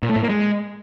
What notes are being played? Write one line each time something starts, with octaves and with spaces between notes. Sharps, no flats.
A#2
A3
A2
A#3
G#3